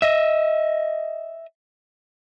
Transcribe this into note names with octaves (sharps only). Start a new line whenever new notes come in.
D#5 E5